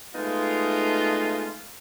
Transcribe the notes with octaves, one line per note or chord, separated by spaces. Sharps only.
G#3 A3 B3 D#4 F4